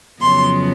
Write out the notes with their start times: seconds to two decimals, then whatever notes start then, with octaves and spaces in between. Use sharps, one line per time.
0.22 F2 C#3 F#3 B3 C6